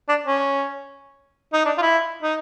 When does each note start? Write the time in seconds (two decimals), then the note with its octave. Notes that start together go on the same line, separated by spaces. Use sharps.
0.09 D4
0.26 C#4
1.53 D#4
1.65 D4
1.78 F4
1.82 E4
2.23 D#4